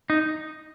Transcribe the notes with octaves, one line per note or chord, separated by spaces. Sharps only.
D#4